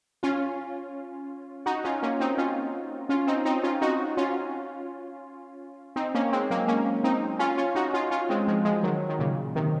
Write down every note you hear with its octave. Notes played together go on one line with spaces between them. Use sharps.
C#4 F4
D#4 F#4
C#4 F4
A#3 C#4
C4 D#4
C#4 F4
C#4 F4
C4 D#4
C4 D#4
C#4 F4
D#4 F#4
C#4 F4
C4 D#4
A#3 C#4
G#3 C4
F#3 A#3
A#3 C#4
C4 D#4
C#4 F4
C#4 F4
D#4 F#4
C#4 F4
C#4 F4
G#3 C4
F3 G#3
F3 G#3
D#3 F#3
D#3
A#2 C#3
C3 D#3